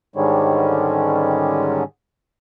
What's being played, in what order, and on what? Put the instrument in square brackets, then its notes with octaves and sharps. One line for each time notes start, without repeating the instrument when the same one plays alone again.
[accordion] G#2 D3 D#3 G3 G#3 C#4